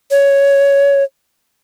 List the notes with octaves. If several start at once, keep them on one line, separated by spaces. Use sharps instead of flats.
C#5